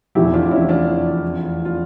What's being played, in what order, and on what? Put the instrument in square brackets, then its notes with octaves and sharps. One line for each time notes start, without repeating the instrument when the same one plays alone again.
[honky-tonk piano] F1 E2 E3 [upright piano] E4 G4
[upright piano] D4 F4
D4
C#4 E4
D4 F4
F4